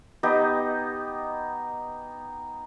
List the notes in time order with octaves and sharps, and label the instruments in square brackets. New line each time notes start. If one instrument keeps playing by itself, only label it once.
[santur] B3 D#4 G4 D#5